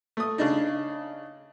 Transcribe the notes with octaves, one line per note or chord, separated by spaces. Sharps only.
A3 D#6
C#3 D4 D#4